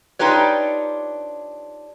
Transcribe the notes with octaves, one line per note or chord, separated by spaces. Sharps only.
D4 D#4 F4 G4 B4 C#5